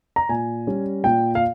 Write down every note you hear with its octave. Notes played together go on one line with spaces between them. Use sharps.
A#5
A#2 G#5
G3 C#4
A#2 G5
F5